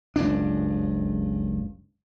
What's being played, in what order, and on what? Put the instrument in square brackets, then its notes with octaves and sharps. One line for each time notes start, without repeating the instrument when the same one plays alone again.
[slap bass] F#1 C#2 G2 D4